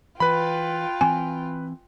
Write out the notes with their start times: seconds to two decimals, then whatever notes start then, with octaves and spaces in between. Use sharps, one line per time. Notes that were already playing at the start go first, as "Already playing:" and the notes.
0.20 E3 F4 B4 G5 B5
1.01 E3 C4 G#5